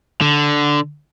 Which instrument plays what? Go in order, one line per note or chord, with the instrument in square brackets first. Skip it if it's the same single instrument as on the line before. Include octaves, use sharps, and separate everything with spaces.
[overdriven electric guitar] D3